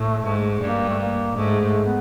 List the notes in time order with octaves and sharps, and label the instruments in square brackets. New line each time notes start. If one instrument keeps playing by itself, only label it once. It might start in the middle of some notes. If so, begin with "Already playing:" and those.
Already playing: [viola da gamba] A2 [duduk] A3
[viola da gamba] G#2
[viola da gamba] G2 [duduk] A#3
[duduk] A3
A#3
[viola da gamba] G#2 [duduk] A3
[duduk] A3
B3